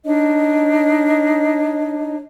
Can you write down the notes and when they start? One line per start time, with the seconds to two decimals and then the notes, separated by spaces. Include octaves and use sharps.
0.04 D4 D#4 C#5 D#5